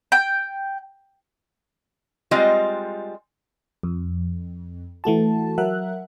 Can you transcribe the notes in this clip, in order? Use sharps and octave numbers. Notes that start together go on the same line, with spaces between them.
G5
G3 G#3 C4 F4 D#5
F2
E3 A3 F#4 A5
F#3 A#4 E5 F#5 F#6